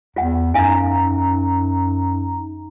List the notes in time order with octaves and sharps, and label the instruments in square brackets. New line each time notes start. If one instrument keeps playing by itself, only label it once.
[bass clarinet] E2 [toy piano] F4 F#5
[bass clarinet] F#2 [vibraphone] D#4 A#5 [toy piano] E4 F5 G#5